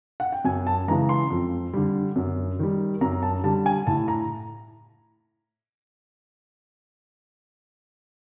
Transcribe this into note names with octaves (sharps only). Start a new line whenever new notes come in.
F#5
G5
F#2 G#5
A5
C#3 E3 G#3 A#5
C6
F2
D3 G3
F#2
D#3 G3
F#2 A#5
A5
D3 G3 A5
G#5
A2 A5
A#5